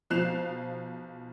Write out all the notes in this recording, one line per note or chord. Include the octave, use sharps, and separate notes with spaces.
B1 F3 F#6 C7 E7 F7